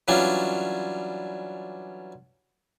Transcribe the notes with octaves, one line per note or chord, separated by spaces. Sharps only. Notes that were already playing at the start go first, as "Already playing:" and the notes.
E3 F#3 G3 C#4 D4 F4